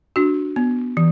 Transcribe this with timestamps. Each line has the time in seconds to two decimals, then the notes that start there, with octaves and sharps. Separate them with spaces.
0.16 D4 F#4
0.56 B3
0.97 E3